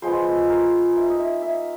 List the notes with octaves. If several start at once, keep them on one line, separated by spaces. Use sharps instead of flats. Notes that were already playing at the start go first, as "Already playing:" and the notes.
F3 G#3 B3 C5
A#4
A#3 D#4 E5
D#5
E5
E5